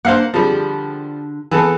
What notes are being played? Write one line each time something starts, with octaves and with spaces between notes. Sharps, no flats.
A#3 D4 C5 F5 F#5
D3 F3 G3 G#4 A5
E3 B3 G#4 A4